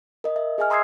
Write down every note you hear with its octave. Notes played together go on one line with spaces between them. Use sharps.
A#4 D#5
E5
G#4 D#5 E5 G#5 F6
A#5 C6 D#6 E6 G#6 C7